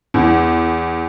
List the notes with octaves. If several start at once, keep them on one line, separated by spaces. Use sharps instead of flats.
E2